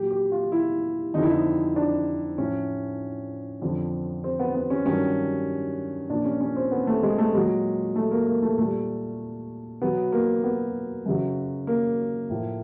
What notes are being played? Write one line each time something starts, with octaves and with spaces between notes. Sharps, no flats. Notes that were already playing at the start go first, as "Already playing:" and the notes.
Already playing: A#2 F#3 G4
G4
F4
E4
F2 D3 F3 D#4
E4
D#4
D4
A2 F3 C#4
F2 D3 F3
C4
B3
B3
C#4
G2 D#3 F#3 C#4
A#2 F3 D4
C#4
C#4
C4
B3
A3
G#3
A3
A#2 F#3 G#3
A3
A#3
A#3
A3
A#2 G3 A3
B2 F#3 B3
A#3
B3
F#2 C#3 F#3
A#3
A2 F3